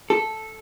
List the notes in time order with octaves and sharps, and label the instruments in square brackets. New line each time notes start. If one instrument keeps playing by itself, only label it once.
[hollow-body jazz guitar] A4